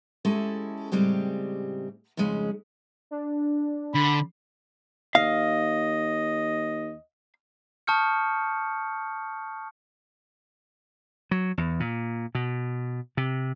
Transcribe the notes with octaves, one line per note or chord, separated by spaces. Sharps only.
G#3 C#4 E4 G4 A4
A2 C#3 G3 G#3 C4 G4
F2 G#2 C#3 G#3 C#4
D4
D3 B5
D#2 D#5 F5
A5 C#6 D#6 F6 G6 C#7
F#3
E2
A#2
B2
C3